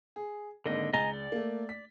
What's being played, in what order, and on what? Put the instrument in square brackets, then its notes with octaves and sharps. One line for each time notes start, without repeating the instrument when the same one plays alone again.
[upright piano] G#4
[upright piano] G#1 A#3 [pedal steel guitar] D3 D#5
[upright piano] C#2 A6 G7 [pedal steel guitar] D#5 G#5 A#5
[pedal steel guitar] D5
[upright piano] A3 A#3
B6